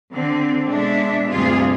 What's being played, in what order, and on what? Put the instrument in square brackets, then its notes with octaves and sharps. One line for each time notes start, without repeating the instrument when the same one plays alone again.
[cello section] D3 C4
B2 G#3 D4 E5
D2 G2 C3 F4 G#4